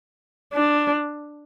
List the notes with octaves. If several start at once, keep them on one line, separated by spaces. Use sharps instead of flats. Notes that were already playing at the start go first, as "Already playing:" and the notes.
D4